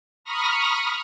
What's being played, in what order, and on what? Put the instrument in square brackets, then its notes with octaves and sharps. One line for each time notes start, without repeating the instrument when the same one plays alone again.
[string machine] A#5 B5 C#6 D#6 F6 A#6